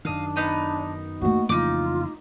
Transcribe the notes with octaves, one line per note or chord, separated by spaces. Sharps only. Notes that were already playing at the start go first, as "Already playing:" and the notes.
F#2 D#3 D4 D#5 F5
B3 D#4 D#5
A3 A#3 F#4
F2 C#3 E3 D#4 F4 D6